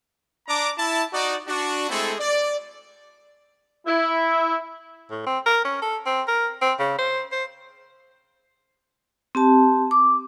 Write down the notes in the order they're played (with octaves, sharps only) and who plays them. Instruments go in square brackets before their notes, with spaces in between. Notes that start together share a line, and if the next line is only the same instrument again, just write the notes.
[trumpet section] D4 A#5 D6
E4 A5
D#4 F#4 D5
D4 F#4
G#3 A3 C4 E4 G#4 A4
D5
[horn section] E4
[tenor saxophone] A2
C4
A#4
C#4
A4
C4
A#4
C4
C#3
C5
C5
[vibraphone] C4 G4 A5
D6